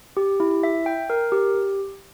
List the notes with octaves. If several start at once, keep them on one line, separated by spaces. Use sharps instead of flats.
G4
E4
E5
G5
A#4
G4